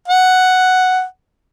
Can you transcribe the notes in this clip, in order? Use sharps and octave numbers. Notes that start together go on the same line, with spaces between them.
F#5